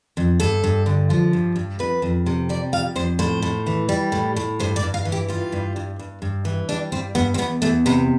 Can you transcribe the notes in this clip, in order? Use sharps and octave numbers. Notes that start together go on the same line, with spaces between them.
F2
G2 A4
G2
D3
F3
G2
G2
F2 B4
F2
C3
G3 D5
F2 F5
F2 C5
A2 C5
A2
E3
G3
A2
A2
G2 C5
D5
G2
F5
E3
G4
G3 F4
G2
G2
G2
G2
E3
G3 D4
G2 C4
G2 B3
C4
E2 B3
E2 A3
C3 B3